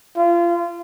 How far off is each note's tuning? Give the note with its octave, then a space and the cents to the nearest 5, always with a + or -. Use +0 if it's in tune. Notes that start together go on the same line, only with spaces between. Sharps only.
F4 -30